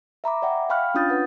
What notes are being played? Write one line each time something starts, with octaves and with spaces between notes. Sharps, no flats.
E5 A#5 B5 D6
D5 E5 F#5 G5
F5 G5 B5 C#6 F6 F#6
C#4 D4 F4 D#6 G6 A6
D4 B4 F#5 D#6